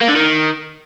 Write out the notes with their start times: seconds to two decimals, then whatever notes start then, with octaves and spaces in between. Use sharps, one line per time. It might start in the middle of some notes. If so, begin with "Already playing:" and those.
0.01 A#3
0.08 D3
0.16 D#3